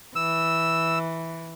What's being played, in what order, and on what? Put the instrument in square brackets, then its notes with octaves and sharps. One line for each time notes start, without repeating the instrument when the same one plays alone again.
[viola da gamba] E3 [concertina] E6